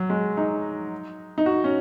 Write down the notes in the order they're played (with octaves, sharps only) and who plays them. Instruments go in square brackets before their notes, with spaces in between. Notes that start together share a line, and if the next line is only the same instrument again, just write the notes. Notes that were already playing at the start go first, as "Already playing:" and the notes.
Already playing: [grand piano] F#3
G#3
D#4
D#4
F#4
C#4